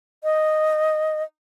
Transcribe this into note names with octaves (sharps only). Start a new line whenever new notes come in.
D#5